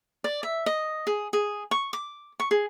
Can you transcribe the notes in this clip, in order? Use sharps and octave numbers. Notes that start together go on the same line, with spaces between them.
D5
E5
D#5
G#4
G#4
C#6
D6
C#6
G#4